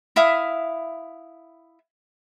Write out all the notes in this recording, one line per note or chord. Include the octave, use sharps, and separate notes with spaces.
E4 E5 F5 D#6